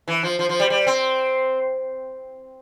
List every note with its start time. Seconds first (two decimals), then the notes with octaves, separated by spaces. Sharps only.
0.08 E3
0.23 F3
0.39 F3
0.49 F3
0.60 G3
0.70 G3
0.87 C4